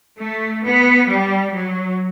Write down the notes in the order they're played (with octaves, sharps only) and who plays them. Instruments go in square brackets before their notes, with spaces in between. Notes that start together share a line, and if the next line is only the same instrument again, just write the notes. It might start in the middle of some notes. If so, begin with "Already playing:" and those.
[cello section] A3
B3
G3
F#3